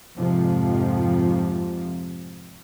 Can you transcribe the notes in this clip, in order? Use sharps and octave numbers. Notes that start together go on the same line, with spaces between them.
F2 G#2 C3 F3